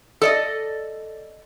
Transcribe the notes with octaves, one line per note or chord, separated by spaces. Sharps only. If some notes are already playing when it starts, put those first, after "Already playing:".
A4 D5 D#5